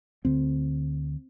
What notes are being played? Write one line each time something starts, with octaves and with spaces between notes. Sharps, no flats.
D2 D3 C4